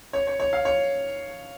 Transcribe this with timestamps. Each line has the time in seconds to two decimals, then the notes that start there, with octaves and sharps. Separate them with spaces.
0.13 C#5
0.27 C#5
0.40 C#5
0.53 F5
0.65 C#5